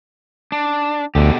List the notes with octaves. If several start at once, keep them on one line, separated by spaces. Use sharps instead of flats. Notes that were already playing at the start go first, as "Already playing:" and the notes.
D4
D2 B2 D3 G4